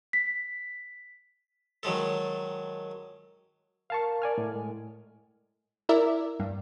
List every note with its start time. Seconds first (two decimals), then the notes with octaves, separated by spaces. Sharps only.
0.13 B6
1.83 D#3 F#3 G#3 A4
3.90 A#4 F5 A5 C#6
4.22 D5 G#5 F6
4.38 A2
4.52 G#3
5.89 E4 A#4 D5 E5
6.40 G2